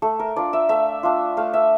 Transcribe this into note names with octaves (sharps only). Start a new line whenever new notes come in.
A3 A4
A#4
D4 F4 D5
E5
A3 E5
D4 F4
A3 F5
E5